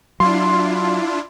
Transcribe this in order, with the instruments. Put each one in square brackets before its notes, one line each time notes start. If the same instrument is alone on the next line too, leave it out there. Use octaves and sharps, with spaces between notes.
[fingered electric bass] F#3 [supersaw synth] D4 E4 F4 [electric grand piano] C6